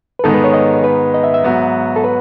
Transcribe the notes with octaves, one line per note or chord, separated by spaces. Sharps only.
B4
G#2 D#3 G#3 B3 D#4 A4
B4
C#5
D#5
B4
D#5
E5
E5
G#2 F#3 B3 F#4
A4
B4